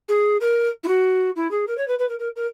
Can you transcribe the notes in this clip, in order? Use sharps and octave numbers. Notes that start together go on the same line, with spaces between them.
G#4
A#4
E4
F#4
E4
G#4
A#4
C#5
B4
B4
A#4
A#4
A#4